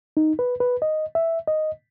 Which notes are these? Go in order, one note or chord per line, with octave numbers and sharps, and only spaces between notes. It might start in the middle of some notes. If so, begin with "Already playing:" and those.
D#4
B4
B4
D#5
E5
D#5